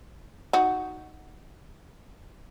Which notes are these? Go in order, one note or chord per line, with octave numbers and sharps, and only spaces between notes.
D#4 F#4